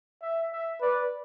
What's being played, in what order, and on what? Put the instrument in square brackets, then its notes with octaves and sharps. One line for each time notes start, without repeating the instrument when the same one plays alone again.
[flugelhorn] E5
E5
[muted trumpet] B4 [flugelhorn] D5